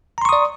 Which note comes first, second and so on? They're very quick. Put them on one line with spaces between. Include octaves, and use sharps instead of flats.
A#5 C6 C#6 D#6 D5